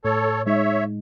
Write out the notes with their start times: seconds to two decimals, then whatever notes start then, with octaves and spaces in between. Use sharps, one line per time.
0.04 A2 A4 C#5
0.46 G#3 D#4 C#5 E5